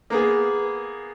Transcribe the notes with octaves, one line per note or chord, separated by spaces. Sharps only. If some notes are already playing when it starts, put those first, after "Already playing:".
A#3 B3 G#4